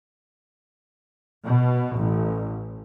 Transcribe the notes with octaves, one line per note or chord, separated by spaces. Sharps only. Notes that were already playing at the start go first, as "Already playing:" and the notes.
B2
A1